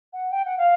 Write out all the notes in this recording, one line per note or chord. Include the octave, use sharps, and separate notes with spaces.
F#5
G5
F#5
F5